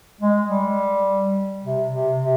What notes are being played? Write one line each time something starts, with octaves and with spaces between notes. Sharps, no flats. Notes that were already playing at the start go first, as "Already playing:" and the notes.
G#3
G3
C3
C3
C3